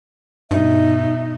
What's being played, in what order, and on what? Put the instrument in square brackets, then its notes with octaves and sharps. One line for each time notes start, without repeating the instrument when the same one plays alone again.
[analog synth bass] G2 [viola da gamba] B2 [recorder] D#4 [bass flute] E5